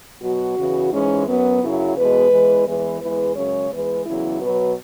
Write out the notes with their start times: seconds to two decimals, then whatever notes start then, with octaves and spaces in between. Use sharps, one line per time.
0.22 B2 F#3 F#4
0.57 E2 C#3 E3
0.92 G#2 E3 G#3 C#4
1.26 F#2 F#3 B3
1.62 F#2 C#3 F#3 E4
1.97 E2 B2 G#3 B4
2.31 E2 E3 G#3
2.67 E2 E3 G#3 B4
3.01 E2 E3 G#3 B4
3.36 F#2 C#3 G#3 C#5
3.70 E2 E3 G#3 B4
4.06 E2 C#3 F#3 E4
4.40 B2 F#3 B4